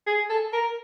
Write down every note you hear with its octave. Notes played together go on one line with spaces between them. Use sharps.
G#4
A4
A#4